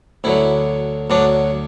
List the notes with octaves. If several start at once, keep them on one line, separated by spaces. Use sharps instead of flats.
D2 D3 F#3 E4
D2 D3 F#3 D4